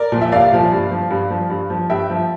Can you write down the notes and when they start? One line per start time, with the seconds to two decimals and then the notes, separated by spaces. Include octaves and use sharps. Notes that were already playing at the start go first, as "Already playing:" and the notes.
Already playing: A#4 D5
0.12 A#2 F3
0.21 E5
0.32 C2 D5 F5
0.52 A#2 F3
0.72 G2
0.91 F3
1.11 G2
1.30 F3
1.50 G2
1.70 F3
1.90 G2 E5 G5
2.10 F3